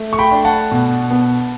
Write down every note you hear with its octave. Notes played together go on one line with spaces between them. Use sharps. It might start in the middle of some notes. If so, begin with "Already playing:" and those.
Already playing: A3
C#6
G5 B5
D4
F#5 A5
B2
B3